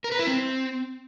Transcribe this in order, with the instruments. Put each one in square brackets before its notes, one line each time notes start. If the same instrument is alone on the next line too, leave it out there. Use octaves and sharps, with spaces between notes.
[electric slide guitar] A#4
B4
E4
C4